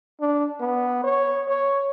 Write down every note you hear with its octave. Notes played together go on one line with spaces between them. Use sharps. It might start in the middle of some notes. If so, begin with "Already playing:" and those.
D4
B3
C#5
C#5